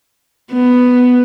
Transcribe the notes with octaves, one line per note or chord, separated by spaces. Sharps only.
B3